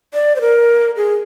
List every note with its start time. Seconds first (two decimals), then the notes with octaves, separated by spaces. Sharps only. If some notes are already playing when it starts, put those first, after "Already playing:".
0.14 D5
0.36 C5
0.41 A#4
0.97 G#4